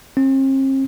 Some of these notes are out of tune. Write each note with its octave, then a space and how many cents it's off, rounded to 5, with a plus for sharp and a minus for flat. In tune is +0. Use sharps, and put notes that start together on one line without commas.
C4 +45